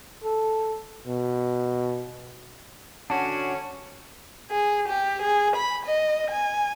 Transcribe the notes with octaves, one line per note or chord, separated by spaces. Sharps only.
A4
B2
D3 C#4 D4 F#4 F#5 A5
G#4
G4
G#4
B5
D#5
G#5